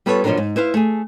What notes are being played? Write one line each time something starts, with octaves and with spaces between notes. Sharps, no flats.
G3 B3 F4 A4 B4 C#5
B2 F3 F#3 B3 D4 A#4
G#2
E4 B4 C5 F5
A3 G#4